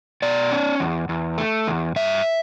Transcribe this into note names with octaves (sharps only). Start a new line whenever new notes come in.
B2 D5
C#4
E2
E2
A3
E2
G2 E5